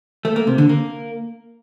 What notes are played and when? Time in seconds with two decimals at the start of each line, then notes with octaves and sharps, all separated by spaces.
0.25 A3
0.36 A#3
0.47 C3
0.58 D3
0.69 A#3